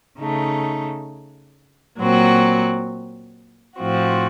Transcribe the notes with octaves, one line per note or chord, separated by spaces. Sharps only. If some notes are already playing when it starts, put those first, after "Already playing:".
C#3 A3 D#4
A#2 F#3 C4 F#4
A2 F3 C4 F#4